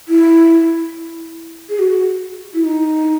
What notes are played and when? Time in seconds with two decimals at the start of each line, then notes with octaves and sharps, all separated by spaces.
0.08 E4
1.69 G#4
1.79 F#4
2.54 E4
2.65 D#4